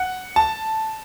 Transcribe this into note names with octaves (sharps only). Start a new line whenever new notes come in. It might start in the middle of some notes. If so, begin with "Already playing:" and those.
Already playing: F#5
A5